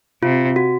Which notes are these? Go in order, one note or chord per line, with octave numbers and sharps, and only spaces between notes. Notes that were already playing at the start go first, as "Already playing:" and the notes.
C3 F4
F#4